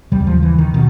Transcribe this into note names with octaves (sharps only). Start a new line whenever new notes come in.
D#2 C#3 G3
F3
E3
D#3
B2 D#3